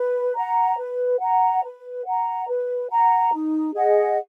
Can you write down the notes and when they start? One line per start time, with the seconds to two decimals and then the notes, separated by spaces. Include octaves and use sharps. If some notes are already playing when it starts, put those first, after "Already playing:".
Already playing: B4
0.34 F#5 A#5
0.77 B4
1.19 F#5 A#5
1.62 B4
2.05 F#5 A#5
2.47 B4
2.90 F#5 A#5
3.32 D#4
3.74 G#4 D#5 F#5